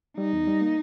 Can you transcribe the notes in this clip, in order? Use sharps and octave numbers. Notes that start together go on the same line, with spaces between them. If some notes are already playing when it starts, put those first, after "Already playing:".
G3 D#4
E2
G3
A#3